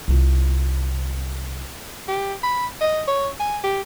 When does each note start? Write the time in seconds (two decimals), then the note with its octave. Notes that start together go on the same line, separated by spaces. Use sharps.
0.08 C2 F4
2.08 G4
2.43 B5
2.81 D#5
3.08 C#5
3.40 G#5
3.64 G4